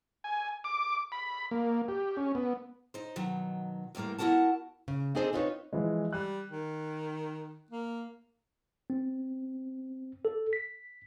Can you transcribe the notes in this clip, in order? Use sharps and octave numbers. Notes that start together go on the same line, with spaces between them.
G#5
D6
B5
A#3
G4
C#4
B3
D#4 C5
B2 D#3 F#3
E2 A2 G3 A#3 A#4
B3 E4 F#4 A#4 F#5 A5
C#3
C4 D4 D#4 G#4 A4 C5
C4 D#4 F4 A4 B4 C#5
E3 F3 G#3
G3 F#6
D#3
A#3
C4
A4
B6